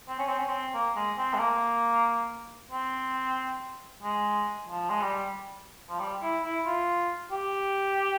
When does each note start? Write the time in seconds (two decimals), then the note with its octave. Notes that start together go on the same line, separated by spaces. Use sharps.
0.08 C4
0.19 C#4
0.29 C4
0.39 C#4
0.49 C4
0.74 A#3
0.96 G#3
1.18 C4
1.34 G#3
1.39 A#3
2.72 C4
4.03 G#3
4.69 F3
4.90 G#3
5.02 G3
5.90 F3
6.00 G3
6.23 E4
6.44 E4
6.66 F4
7.32 G4